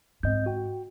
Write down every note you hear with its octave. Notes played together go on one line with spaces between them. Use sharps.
G#2 C4 D#5 G6
F#4 G5